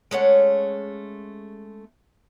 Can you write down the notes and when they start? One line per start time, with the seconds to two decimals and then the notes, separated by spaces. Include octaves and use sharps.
0.11 G#3 A3 C#4 F#5